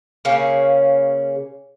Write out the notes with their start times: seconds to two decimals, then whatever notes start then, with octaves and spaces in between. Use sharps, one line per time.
0.25 C#3 A#3 C#4 G#4